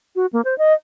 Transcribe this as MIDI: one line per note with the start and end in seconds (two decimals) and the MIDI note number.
0.16 0.26 66
0.33 0.41 58
0.45 0.57 72
0.58 0.73 75